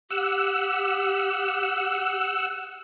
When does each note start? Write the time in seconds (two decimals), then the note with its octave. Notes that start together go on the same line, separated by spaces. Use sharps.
0.11 G4 F#5 E6